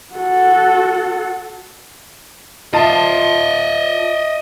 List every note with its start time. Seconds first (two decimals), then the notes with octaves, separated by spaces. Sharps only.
0.13 F#4 A4
2.74 F4 D#5 E5 A5